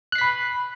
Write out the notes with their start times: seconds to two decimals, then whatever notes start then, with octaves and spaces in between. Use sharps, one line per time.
0.12 F#6
0.15 C7
0.18 B6
0.21 B5